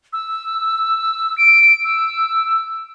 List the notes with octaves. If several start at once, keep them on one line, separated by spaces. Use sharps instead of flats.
E6
D7
E6